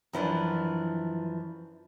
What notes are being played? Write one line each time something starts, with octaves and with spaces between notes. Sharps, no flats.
F#2 E3 F3 D4